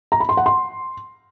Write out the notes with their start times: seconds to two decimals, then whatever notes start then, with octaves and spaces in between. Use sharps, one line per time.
0.12 A#5
0.20 B5
0.29 C6
0.37 F#5
0.46 C6